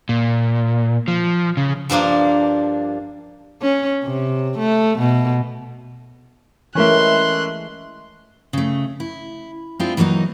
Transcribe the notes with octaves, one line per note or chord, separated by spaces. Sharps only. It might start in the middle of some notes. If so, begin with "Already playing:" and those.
A#2
F3
C#3
G2 F3 A#3 D4
C#4
C3
A3
B2
E3 G#3 A3 C#4 A#4 E5 C6 F#6
C#3 A3
E4
G#3 C4 D4 E4 F4
E3 F#3 A#3 B3 D#4